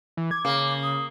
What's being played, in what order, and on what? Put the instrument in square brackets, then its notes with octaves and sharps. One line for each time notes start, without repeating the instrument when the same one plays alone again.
[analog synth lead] E3
[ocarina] D6 [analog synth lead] G#6
[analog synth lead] C#3 [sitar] A#3
[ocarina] D#6